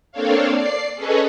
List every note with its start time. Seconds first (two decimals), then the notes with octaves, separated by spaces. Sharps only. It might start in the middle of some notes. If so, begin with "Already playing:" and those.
0.12 A#3 C4 D4 A4 C#5 F5
0.50 D5 C7
0.95 C#4 G#4 A4 B4 C#5 D#5